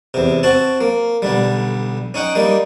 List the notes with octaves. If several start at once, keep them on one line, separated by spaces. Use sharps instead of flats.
E2 C3
C4 F#4 A5
A#3
B1 D3 G3
C#4 D#4 F#5 G5
G3 A#3 D#4